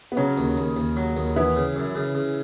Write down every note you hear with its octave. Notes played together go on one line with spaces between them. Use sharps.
B3
C#3 F#3 C#4
D#2
D#2
D#2
F#3
D#2
E3 B3 E4
C#3
F#2
C#3
C#3